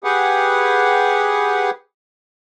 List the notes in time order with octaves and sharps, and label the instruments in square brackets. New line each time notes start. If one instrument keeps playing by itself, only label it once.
[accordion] G4 G#4 B4 F#5